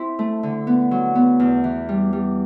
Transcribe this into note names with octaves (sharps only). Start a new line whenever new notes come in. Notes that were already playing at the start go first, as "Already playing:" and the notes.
Already playing: C4 E4
A3
D3
B3
F#3
B3
E2
E3
G3
G3